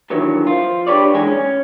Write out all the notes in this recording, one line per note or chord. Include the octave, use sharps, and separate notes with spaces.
G2 D#3 E3 F#3
F3 F4
D4 G4 B4 C#5 D5
G#2 E3 G#3 D4 G#5
C#4